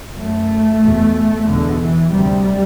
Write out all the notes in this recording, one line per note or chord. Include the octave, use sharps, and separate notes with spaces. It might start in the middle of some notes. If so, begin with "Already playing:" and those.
F#2 A3
E2 B2
E2 B2 D3
E3
D2 C3 G3